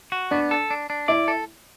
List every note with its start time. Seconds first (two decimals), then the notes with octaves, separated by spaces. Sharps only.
0.12 F#4
0.31 B3 D4
0.51 A4
0.70 D4
0.90 D4
1.08 E4 D5
1.28 A4